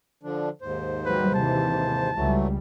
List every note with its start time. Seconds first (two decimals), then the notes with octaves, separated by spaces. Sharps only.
0.23 D3 F3 D4
0.62 D#2 G#2 C5
1.05 F#3 G3 B4
1.35 C3 E3 A5
2.15 C#2 E3 F#3 G3 A3